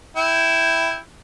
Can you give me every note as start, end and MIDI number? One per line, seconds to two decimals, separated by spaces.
0.17 0.98 64
0.17 0.98 79